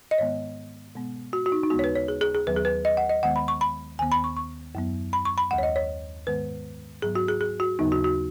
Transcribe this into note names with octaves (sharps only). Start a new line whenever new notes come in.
D#5
G#2 D#3 G#3 B3 C#5
B2 G#3 B3
F#4
F#4
D#4
D#4
D#2 C#3 G#3 B3 F#4
C#5
B4
C#5
G#4
G#4
G#4
D#2 D#3 F#3 B3 B4
G#4
B4
D#5
F#5
D#5
D#2 D#3 G#3 B3 F#5
B5
C#6
B5
D#2 D#3 B3 G#5
B5
C#6
C#6
F#2 F#3 B3
B5
C#6
B5
D#2 D#3 G#3 F#5
C#5
D#5
C#5
G#2 D#3 G#3 B3 B4
G#2 F#3 B3 G#4
F#4
G#4
G#4
F#4
D#2 C#3 F#3 B3 D#4
F#4
F#4